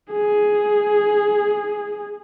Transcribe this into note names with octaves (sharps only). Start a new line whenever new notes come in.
G#4